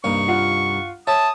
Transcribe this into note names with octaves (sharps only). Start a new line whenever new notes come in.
C2 G2 A#3 D#4 C#6
F4 F5 F#5
C#5 E5 A5 D#6